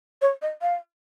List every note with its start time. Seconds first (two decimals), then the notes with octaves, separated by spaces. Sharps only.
0.22 C#5
0.42 D#5
0.62 F5